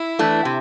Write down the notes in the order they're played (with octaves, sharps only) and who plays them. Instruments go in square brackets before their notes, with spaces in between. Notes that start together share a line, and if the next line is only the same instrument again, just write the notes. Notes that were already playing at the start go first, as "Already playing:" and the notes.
Already playing: [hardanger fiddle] E4
[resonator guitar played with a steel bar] E3 A3 D4
C3